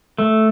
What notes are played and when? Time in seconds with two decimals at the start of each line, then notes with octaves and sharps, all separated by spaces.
0.18 A3